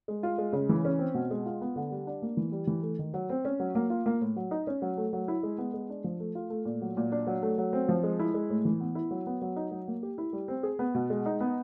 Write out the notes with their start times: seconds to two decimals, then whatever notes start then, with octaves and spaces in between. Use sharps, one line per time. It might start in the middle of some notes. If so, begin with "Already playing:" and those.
0.08 G#3
0.23 F4
0.38 G#3
0.53 C#3
0.69 E3
0.85 C#4
0.99 C4
1.14 B2
1.31 G#3
1.46 F4
1.61 B3
1.76 D3
1.91 G3
2.07 D4
2.22 A#3
2.37 E3
2.52 G3
2.67 E3
2.82 A3
2.99 D#3
3.14 F#3
3.30 C4
3.45 C#4
3.60 F#3
3.75 A#3
3.90 F4
4.06 A#3
4.21 A2
4.36 F#3
4.51 D#4
4.67 C#4
4.82 F#3
4.97 A3
5.13 F#3
5.28 E4
5.43 G#3
5.58 B3
5.74 G#3
5.90 D4
6.04 F3
6.20 A3
6.35 F4
6.50 A3
6.65 A#2
6.81 F#3
6.97 A#2
7.12 D4
7.27 F#3
7.42 A3
7.58 F#3
7.73 C4
7.89 F3
8.03 G#3
8.19 E4
8.34 G#3
8.50 A2
8.65 E3
8.80 B3
8.95 E4
9.11 F#3
9.26 B3
9.42 F#3
9.56 D#4
9.71 F#3
9.88 A#3
10.03 G4
10.18 E4
10.33 G3
10.48 C4
10.63 G#4
10.79 B3
10.95 B2
11.10 G#3
11.26 D#4
11.40 B3